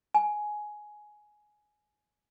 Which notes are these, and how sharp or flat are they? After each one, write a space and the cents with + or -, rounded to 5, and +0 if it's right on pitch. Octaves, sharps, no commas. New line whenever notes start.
G#5 +15